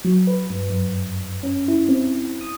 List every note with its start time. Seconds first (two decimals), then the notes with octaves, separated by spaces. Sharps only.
0.05 F#3
0.27 B4
0.50 G2
0.70 F#2
1.43 C#4
1.68 E4
1.89 C4
2.41 D#6